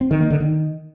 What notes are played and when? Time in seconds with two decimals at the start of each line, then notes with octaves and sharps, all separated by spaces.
0.01 C4
0.11 D#3
0.21 A#3
0.30 D3
0.40 D#3